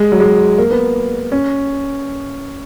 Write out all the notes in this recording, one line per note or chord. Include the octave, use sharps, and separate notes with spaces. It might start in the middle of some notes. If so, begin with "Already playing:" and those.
Already playing: G#3
F#3
G#3
A#3
B3
C#4